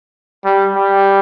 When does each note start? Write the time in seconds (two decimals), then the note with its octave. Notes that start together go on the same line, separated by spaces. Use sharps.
0.45 G3
0.76 G3